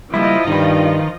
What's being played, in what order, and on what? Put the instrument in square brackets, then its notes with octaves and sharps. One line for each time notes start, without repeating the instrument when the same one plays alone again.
[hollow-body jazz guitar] C#2 G3 A#3 [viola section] F3 F4 D#5 [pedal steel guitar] E4
[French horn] G2 [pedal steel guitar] D#3 [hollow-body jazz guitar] D#4 B4